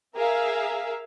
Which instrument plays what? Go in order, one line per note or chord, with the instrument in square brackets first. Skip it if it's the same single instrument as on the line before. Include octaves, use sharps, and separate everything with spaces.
[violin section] G#4 A#4 E5 F5